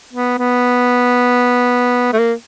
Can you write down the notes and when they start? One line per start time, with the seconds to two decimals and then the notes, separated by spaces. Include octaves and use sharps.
0.13 B3
0.39 B3
2.13 A3
2.18 A#3